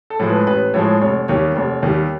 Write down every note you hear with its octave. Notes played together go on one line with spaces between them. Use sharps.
A4
A2 F3 G#3
B4
A1 B4
A2 F3 G#3 C#5
F1 C#5
D#2 D#3 G3 C#5
F1
D#2 D#3 G3